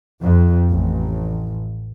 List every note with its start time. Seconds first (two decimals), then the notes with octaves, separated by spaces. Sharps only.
0.23 F2
0.70 A1